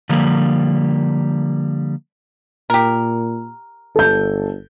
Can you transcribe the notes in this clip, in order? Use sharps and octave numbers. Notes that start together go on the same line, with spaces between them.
D3 F3 G3 A#3
A#2 G4 A#4
G1 A4 G6